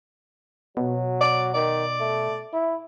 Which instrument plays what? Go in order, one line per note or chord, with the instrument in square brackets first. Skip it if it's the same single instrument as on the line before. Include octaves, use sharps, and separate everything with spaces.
[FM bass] B2 [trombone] F#3
[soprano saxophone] D5
[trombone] D#3 [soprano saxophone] D5
[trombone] A3
E4